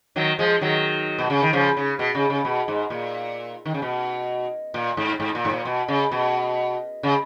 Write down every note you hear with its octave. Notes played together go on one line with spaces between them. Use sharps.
D#3 F#3
F3 G#3
D#3 F#3
B2
C#3
D#3
C#3 F3
C#3
B2
C#3
C#3
B2
G#2
A#2
D#3
C#3
B2
A#2
G#2
G#2
A#2
G#2
A#2
B2
C#3
B2
C#3